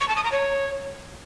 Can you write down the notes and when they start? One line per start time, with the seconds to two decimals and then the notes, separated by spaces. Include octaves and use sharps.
0.01 C#6
0.08 A5
0.16 D#6
0.24 A#5
0.32 C#5